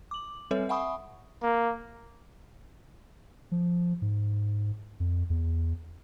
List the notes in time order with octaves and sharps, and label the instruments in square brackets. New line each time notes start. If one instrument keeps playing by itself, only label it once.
[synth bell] D6 F#7
G3 C4 A4 B4 C#5 E5
E5 F#5 G#5 B5 C#6 D#6
[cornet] A#3
[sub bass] F3
G#2
F2
E2